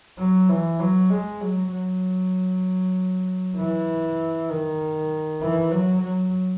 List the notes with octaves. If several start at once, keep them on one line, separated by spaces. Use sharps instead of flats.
F#3
E3
F#3
G#3
F#3
F#3
E3
D#3
E3
F#3
F#3